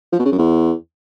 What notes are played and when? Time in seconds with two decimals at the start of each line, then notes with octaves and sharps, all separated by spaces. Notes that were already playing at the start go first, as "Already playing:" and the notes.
0.12 F3
0.19 B2
0.25 C#3
0.32 F#2
0.38 E2